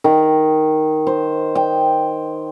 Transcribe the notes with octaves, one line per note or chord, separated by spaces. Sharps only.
D#3
C5
G5